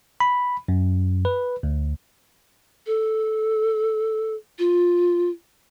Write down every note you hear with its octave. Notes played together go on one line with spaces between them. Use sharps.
B5
F#2
B4
D2
A4
F4